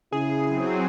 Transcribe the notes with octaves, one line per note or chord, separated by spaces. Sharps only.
C#3 E4 G#4
F#3 C4